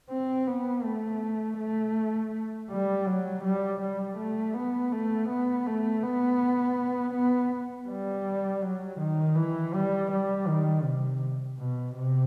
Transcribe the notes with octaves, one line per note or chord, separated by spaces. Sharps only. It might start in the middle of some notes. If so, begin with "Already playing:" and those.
C4
B3
A3
A3
G3
F#3
G3
G3
A3
B3
A3
B3
A3
B3
B3
G3
F#3
D#3
E3
G3
G3
D#3
C3
B2
C3